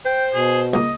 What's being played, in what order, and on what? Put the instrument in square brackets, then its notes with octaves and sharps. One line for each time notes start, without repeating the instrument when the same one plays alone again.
[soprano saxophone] C5 [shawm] G5
[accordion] B2 [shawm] G#4
[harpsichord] C#2 A#3 [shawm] D#5